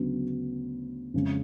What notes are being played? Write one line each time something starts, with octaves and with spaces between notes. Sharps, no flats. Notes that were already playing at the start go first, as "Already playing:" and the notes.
Already playing: D2 C#3 F#3 B3
F2 C#3 G#3